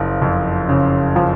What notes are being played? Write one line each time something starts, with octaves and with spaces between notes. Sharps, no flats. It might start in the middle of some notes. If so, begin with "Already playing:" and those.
Already playing: F#1 F3
F2
C#3
F3